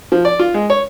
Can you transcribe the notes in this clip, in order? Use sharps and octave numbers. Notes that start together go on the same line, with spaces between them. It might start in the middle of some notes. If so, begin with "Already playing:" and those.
F3
D5
F4
G#3
C#5